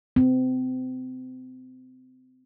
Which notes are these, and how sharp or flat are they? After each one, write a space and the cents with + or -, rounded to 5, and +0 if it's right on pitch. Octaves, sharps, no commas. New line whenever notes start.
C4 -30